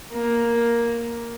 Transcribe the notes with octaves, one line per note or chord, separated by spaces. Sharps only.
A#3